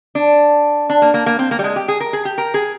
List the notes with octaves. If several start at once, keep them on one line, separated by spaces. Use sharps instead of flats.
D4
D4
A#3
A#3
A#3
C4
A#3
G3
G#3
G4
G#4
A#4
G#4
G4
A#4
G#4